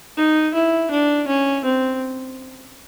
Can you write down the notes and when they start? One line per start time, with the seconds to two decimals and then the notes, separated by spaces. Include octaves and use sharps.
0.17 D#4
0.54 E4
0.91 D4
1.28 C#4
1.64 C4